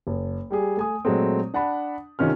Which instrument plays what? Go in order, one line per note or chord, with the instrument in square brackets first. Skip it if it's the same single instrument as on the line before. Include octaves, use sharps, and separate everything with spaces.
[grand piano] F#1
G3 G4 G#4
A3 G#5 D#6
A#2 F#3 G#3 A3 C4
D4 F#5 A5 B5
C3 D#3 C#4 F4 F6